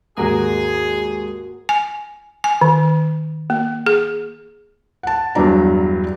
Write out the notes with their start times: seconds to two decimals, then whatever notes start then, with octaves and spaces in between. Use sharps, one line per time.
0.18 D#2 G#2 A#3 F#4 G#4 A#4
1.69 G#5
2.44 G#5
2.61 D#3
3.50 A#3
3.86 G#4
5.03 F#5 A5
5.35 E2 G2 F#3 D4 A#5